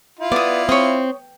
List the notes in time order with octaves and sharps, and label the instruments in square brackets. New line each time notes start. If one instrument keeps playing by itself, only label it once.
[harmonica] E4 F4
[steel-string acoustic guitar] B3 [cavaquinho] D5 D#6
[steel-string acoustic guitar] C4 [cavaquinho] C#5 D#6